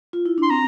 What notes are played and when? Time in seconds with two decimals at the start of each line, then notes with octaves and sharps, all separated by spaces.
0.13 F4
0.26 E4
0.38 D4 C6
0.50 C4 A#5